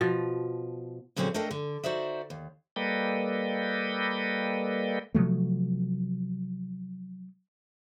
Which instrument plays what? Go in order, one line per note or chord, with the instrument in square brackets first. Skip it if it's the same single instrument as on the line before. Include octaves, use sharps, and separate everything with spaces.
[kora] B2 F3
[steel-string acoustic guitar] A#2 D3 F#3 C4 C#4 G#4
A3 D4 A4 A#4 D#5 G5
D3
D#4 F#4 C5 D5 E5
D#2
[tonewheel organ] G3 A#3 A4 B4 D#5 G5
[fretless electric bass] C3 F3 F#3 A3